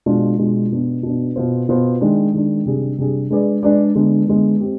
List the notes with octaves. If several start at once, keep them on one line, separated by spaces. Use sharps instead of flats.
B2 G#3 D4 F4
B2 G#3 D4 F4
B2 B3 D4
B2 B3 D4
B2 B3 F4 C5
B2 B3 F4 C5
D#3 G#3 D4
D#3 G#3 D4
C3 G3 D4 G#4
C3 G3 D4 G#4
G#3 D4 G#4 B4 D5
G#3 D4 G#4 B4 D5
D3 G#3 B3
D3 G#3 B3
C4 G4